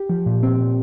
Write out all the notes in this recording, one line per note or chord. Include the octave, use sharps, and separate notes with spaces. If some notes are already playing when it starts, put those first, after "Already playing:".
Already playing: G4
F3
A#2
C4
A#2